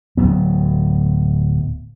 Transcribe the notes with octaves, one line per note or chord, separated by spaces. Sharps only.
D1 F#3 B3